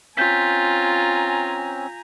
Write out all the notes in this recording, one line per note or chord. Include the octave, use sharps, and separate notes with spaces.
C4 C#4 F4 G#5 A#5 G6 B6